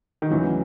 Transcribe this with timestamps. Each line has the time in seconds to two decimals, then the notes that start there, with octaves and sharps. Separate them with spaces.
0.22 D#3
0.30 D2 C#3 E3 F#3